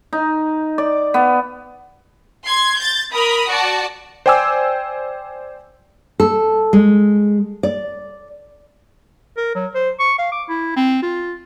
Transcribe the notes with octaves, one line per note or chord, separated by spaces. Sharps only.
D#4
D5
B3
C6 G#6
G6 A6
A#4 B5 D#6
F#4 D5 A5
C5 D5 G5 G#5 D6 E6
A4
G#3
D5
A#4
F#3
C5
C#6
F5
D6
E4
C4
F4